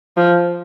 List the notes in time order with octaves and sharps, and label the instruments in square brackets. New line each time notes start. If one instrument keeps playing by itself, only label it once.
[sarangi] F3